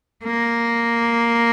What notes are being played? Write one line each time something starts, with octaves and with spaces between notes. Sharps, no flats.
A#3